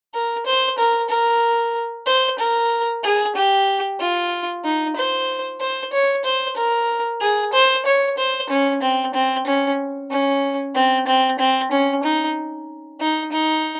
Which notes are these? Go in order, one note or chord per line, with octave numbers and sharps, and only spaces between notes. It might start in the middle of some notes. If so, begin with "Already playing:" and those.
A#4
C5
A#4
A#4
C5
A#4
G#4
G4
F4
D#4
C5
C5
C#5
C5
A#4
G#4
C5
C#5
C5
C#4
C4
C4
C#4
C#4
C4
C4
C4
C#4
D#4
D#4
D#4